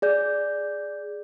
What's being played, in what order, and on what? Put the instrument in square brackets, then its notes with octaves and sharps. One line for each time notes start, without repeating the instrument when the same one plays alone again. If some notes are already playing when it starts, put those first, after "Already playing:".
[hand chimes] G#4 D5 G6